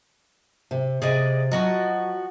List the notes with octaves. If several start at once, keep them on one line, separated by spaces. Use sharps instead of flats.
C3
C3 G#4 D5 D#5
F3 F#3 F#4 D#5